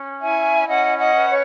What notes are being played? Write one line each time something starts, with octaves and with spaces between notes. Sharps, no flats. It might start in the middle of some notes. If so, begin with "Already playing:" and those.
Already playing: C#4
E4 E5 G#5
C#4 D#5 F#5
D#5 F#5
B4
C#5